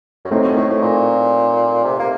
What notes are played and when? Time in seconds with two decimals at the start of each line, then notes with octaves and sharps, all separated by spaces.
0.25 F#2
0.31 A2 A3 C4 D#4
0.43 F#2
0.57 A2
0.69 A2
0.82 A#2
1.84 C3
1.99 A#3